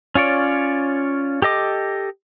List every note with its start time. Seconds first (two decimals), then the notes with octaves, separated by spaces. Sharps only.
0.15 C#4 F4 C#5 D5
1.42 G4 A4 D#5 D6